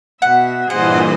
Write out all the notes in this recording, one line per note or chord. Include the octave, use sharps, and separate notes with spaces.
B2 E5 F#5
G2 A#2 E3 G#4 C5 D#5 F#5